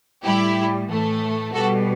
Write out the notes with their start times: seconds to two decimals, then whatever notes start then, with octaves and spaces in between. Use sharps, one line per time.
0.23 A2 G3 E4 G4
0.89 A2 E3 A3
1.53 B2 G3 F#4 A4